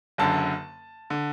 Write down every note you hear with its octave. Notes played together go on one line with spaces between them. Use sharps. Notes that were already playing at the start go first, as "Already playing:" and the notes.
F#1 F#2 D3 A5
D3